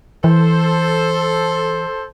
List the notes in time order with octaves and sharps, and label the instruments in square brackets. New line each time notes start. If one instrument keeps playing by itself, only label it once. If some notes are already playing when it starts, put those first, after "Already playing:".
[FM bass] E3 [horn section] A4 C5